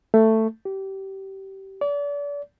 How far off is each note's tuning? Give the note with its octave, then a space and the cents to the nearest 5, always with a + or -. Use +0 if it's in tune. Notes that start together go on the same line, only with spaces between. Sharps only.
A3 +10
G4 -25
D5 -35